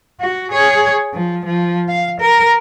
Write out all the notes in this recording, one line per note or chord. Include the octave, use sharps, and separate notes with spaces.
F#4
G#4 C#5
F3
F3
F5
A#4